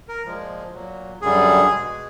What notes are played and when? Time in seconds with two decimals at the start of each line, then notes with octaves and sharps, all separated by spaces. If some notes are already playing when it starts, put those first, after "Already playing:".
0.08 A#4
0.25 A#2 F3 G#3
0.73 A#2 F#3
1.21 F#2 D3 G3 G#4
1.71 B2 G#3